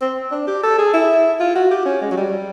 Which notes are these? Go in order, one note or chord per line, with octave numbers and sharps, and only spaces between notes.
C4
D4
G4
A4
G#4
E4
F4
F#4
G4
C#4
G#3
F#3
G3